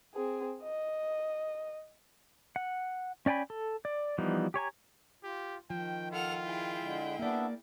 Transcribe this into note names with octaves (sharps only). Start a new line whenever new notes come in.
C4 G#4
D#5
F#5
C#4 D5 G5 G#5 B5
A4
D5
E3 F3 G3 B3 D#4
G4 C#5 G#5 A#5
F4 G4
D#3 F3 G5
F4 A4 F#5 F6
E4 G#4 G5
D3 G#3
A#3 B3 D4 D5 E5